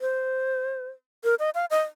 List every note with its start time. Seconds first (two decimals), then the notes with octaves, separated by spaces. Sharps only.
0.01 C5
1.24 A#4
1.39 D#5
1.55 F5
1.70 D#5